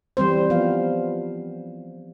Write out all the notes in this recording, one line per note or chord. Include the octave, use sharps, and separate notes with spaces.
E3 G3 C4 C5
F3 B3 F5